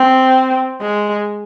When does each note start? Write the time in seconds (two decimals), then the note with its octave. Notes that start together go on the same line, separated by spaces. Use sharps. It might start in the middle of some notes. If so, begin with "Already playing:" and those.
Already playing: C4
0.82 G#3